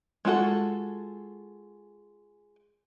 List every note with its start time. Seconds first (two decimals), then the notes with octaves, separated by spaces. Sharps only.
0.25 G#3 F4 F#4 A4